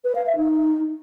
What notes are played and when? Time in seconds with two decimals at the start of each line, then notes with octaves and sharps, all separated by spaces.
0.04 B4
0.15 F5
0.25 E5
0.36 D#4